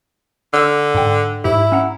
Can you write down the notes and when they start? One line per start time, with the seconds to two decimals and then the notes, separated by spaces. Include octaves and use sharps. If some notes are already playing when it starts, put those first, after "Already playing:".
0.53 D3 E6 F6
0.95 G#2 G5
1.44 G#2 E4 G4
1.72 C#4 F#5 A#5